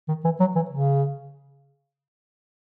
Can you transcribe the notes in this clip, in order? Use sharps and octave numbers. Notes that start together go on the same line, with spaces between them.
D#3
E3
F#3
E3
C#3